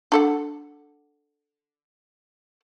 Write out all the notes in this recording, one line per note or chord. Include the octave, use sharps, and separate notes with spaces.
D4 A4 F#5